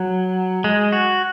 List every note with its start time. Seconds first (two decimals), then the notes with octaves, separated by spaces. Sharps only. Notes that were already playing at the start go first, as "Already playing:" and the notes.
Already playing: F#3
0.64 G#3
0.92 F#4